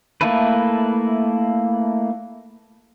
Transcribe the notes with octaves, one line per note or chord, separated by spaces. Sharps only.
A3 A#3 E4 A4 B4